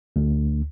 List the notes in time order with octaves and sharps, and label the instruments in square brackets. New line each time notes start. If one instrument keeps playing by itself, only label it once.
[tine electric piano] D2